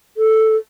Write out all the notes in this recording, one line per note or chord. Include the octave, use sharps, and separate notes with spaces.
A4